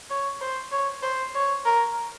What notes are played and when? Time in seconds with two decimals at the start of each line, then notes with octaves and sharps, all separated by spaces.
0.10 C#5
0.41 C5
0.72 C#5
1.03 C5
1.34 C#5
1.65 A#4